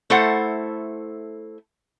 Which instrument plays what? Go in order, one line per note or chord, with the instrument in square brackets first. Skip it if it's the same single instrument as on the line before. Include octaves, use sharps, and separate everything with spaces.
[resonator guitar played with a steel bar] A3 E4 A4 C5 F#5